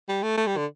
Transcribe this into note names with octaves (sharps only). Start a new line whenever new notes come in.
G3
A3
A3
G3
D3